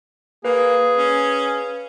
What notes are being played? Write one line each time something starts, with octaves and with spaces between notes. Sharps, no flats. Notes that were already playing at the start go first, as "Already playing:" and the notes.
A#3 G#4 B4 F5
C#4